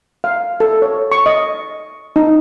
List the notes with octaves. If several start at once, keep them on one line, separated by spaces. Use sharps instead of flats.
F5
A4
C#5
C#6
D#5
D#4